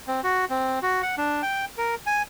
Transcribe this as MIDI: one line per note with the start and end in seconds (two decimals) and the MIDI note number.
0.08 0.21 60
0.24 0.45 66
0.50 0.79 60
0.82 1.02 66
1.02 1.15 78
1.17 1.42 62
1.42 1.65 79
1.78 1.95 70
2.06 2.22 80